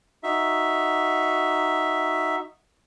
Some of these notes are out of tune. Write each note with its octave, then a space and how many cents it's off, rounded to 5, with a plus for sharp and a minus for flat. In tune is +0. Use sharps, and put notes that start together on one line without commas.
D#4 +0 F#4 +0 E5 +0